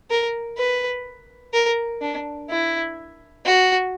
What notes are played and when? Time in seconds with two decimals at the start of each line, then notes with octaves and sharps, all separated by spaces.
0.10 A#4
0.57 B4
1.53 A#4
2.01 D4
2.50 E4
3.45 F#4